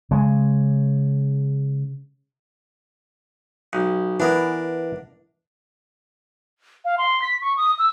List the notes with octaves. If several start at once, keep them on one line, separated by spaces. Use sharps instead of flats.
C#3 G#3
B1
E3 B3 D4 A#4
F5
C6
B6
C#6
D#6
E6